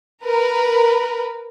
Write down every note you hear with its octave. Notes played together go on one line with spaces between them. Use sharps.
A#4 B4